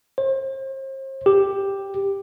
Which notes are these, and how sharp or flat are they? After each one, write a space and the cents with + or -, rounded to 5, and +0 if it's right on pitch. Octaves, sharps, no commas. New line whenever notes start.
C5 +40
G4 +5